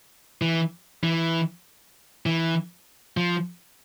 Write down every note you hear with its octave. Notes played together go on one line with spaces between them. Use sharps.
E3
E3
E3
F3